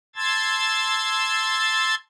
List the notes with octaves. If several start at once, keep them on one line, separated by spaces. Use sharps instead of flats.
A5 C6 E6 G#6 A6